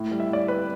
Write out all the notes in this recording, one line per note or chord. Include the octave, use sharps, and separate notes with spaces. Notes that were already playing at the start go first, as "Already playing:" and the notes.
Already playing: A2
G3
E5
A2 D5
G3 B4